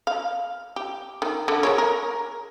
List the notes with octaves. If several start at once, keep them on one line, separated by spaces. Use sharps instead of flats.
F5
G4
D#3
D3
G#3 A#4 C#5
A#4